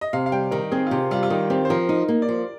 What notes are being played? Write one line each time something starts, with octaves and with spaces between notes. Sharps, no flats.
D#5
C3 F5
F5
G3 G5
D#3 A#4
C4 G#4
F4
C3 G4
G3 F4
F4
D#3 D#4
C4 G4
C5
F3 A#4
D#4
A#3
D5
F3